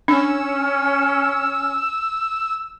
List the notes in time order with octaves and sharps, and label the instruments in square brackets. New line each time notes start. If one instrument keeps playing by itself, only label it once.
[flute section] C#4 [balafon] D4 [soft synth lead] E6